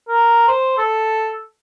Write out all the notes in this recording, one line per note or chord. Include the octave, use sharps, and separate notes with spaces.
A#4
C5
A4